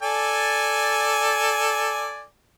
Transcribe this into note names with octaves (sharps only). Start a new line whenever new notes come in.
A4 D5 G#5